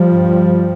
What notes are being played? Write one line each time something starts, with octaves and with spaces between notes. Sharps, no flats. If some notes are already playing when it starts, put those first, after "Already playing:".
Already playing: F3 G3
G2